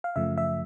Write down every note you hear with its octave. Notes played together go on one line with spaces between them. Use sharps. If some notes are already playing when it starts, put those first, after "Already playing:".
F5
F#2 C#3 F3 A3 E5
E5